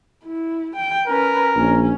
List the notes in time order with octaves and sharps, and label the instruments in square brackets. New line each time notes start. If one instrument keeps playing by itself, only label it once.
[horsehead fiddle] E4
G5
[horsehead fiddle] C#4 B4 [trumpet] A#4
[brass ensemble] A#1 [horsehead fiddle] C#4